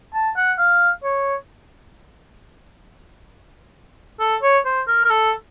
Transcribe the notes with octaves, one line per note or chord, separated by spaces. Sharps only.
A5
F#5
F5
C#5
A4
C#5
C5
A#4
A#4
A4